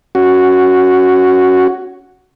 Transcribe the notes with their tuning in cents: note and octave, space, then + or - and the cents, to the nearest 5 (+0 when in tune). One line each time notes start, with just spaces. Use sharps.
C#4 +0 F#4 +0